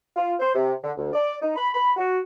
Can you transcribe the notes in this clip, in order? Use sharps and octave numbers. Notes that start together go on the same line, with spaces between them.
F4
C5
C3
D3
D2
D5
D#4
B5
B5
F#4